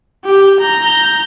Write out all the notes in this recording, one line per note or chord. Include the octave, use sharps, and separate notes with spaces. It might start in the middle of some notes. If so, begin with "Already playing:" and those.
G4
A#5 G6